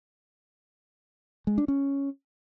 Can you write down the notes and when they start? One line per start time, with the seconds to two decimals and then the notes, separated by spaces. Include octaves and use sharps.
1.47 G#3
1.58 D4
1.68 C#4